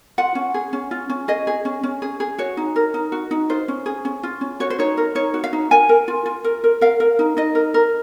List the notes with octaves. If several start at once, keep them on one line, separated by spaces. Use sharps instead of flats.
F4 F#5
C#4
G#4
C#4
F4
C#4
G#4 D#5
G#4
C#4
C#4
G#4
G#4
F#4 C#5
D#4
A#4
D#4
F#4
D#4
F4 C5
C#4
G#4
C#4
F4
C#4
F#4 C#5
C5
D#4 C#5
A#4
D#4 C#5
F#4
F5
D#4
A#4 G#5
A#4
F4
F4
A#4
A#4
A#4 F5
A#4
D#4
D#4 D#5
A#4
A#4